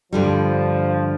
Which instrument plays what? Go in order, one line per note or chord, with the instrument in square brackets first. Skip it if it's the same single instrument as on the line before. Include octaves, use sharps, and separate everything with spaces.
[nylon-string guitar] G2 D3 G3 [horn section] F3